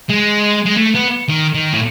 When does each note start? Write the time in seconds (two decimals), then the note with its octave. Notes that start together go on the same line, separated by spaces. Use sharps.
0.10 G#3
0.66 G#3
0.78 A3
0.95 B3
1.28 D#3
1.55 D#3
1.73 A2